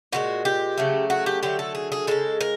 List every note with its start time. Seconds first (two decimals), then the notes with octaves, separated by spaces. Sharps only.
0.12 A#2 F3 G#3 F#4
0.45 G4
0.78 C#3 F#3 A3
1.10 F#4
1.26 G4
1.43 D3 F#3 A3 G4
1.59 A4
1.75 G#4
1.92 G#4
2.07 C#3 F3 G#3 A4
2.41 A#4